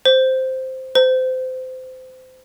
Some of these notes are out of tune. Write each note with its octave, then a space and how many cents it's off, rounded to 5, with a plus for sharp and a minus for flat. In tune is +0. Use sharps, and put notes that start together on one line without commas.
C5 -5
C5 -25